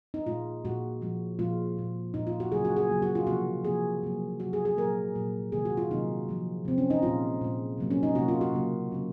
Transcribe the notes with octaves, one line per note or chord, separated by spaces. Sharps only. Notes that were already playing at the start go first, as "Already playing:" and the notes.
D#4
A#2 G#3 F4
A#2 G#3 F#4
A#2 F3 G#3
A#2 F3 G#3 F4
A#2 G#3
A#2 G#3 D#4
F4
F#4
C#3 F#3 A#3 G#4
F#4
G#4
C#3 F#3 A#3
F#4
F4
C3 F3 A#3 F#4
C3 F3 A#3 G#4
C3 F#3 A#3
C3 F#3 A#3 F#4
G#4
G#4
A#2 F#3 A#3 A#4
A#2 F#3 A#3
C3 D#3 F#3 A#3 G#4
F#4
F4
C3 D#3 F#3 A#3 D#4
C3 F3 G#3
C3 F3 G#3 C4
C#4
D#4
A#2 G#3 F4
A#2 G#3
C3 F#3 A#3
C#4
D#4
C3 F#3 A#3 F#4
F4
F#4
C#3 F#3 A#3
C#3 F#3 A#3